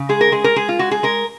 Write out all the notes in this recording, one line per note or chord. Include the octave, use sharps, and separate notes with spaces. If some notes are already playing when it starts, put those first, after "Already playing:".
Already playing: C#3
G#3 G#4
A#4
G#3 G#4
A#4
G#3 G#4
F4
G#3 F#4
G#4
G#3 A#4